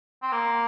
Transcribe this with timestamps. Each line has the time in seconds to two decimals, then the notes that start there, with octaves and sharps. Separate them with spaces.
0.23 C4
0.32 A#3